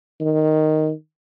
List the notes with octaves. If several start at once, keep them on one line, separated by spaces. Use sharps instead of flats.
D#3